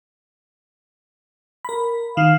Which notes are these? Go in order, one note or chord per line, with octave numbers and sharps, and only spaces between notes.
A#4 B5
D#3 F5